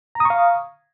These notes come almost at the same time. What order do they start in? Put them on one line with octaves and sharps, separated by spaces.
A#5 D#6 C#6 F5